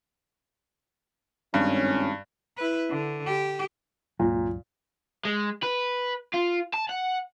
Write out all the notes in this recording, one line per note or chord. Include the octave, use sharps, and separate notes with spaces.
G#1 G2 C#4
E4 B4
D3
G4
C#2 G2 A#2 F#3
G#3
B4
F4
A5
F#5